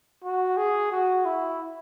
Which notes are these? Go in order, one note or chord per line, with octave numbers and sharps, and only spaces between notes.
F#4
G#4
F#4
E4